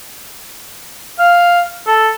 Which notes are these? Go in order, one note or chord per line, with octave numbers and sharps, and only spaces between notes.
F5
A4